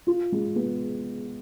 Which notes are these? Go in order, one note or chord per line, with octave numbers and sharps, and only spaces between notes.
F4
G#3
B3